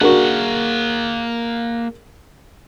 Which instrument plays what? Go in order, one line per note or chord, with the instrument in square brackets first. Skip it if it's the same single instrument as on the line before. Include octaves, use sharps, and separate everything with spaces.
[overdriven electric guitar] A#3 F#5 [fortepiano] D4 F#4 [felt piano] G#4 A#4